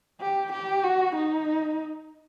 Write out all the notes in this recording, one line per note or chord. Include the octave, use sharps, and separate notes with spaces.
G4
G4
F#4
D#4